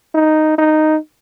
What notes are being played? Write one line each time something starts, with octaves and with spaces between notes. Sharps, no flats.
D#4
D#4